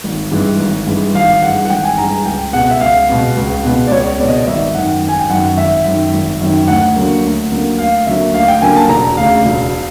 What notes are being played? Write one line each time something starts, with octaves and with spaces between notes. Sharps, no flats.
G#1
G2 E3 G#3
G#1
G2 E3 G#3
G#1 F5
G2 E3 G#3 F#5
F#5
G#1 G5
G#5
G2 E3 G#3 A#5
G#5
C#2 G5
B2 G#3 B3 F#5
E5
C#2 F5
B2 G#3 B3
C#2
B2 G#3 B3
D5
C#2 C#5
B2 G#3 B3 D5
D#5
D5
G#1 E5
F#2 D#3 F#5
G#1
G#5
G5
F#2 D#3 F#5
G#1 E5
F#2 D#3
G#1
F#2 D#3
D2 F#5
D3 F#3 A#3
D2
D3 F#3 A#3
D2 F5
D3 F#3 A#3 E5
D2 F5
G5
D3 F#3 A#3 G#5
A5
E1 A#5
D2 C#3 F5
E1